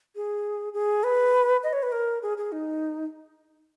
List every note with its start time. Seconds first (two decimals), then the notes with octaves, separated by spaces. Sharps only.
0.16 G#4
0.74 G#4
1.04 B4
1.63 D#5
1.73 C#5
1.83 B4
1.92 A#4
2.22 G#4
2.38 G#4
2.52 D#4